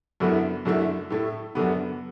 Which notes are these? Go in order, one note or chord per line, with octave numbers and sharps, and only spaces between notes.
F#2 D3 B3 E4
F#2 D3 A3 E4
A2 A3 E4
F#2 D3 B3